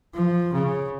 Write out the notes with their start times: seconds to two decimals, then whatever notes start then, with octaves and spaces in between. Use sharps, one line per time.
0.15 F3
0.53 C#3